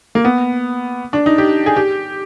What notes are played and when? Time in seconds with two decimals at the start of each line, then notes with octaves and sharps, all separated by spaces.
0.15 A#3
0.25 B3
1.13 D4
1.26 D#4
1.38 G4
1.66 G#4
1.76 G4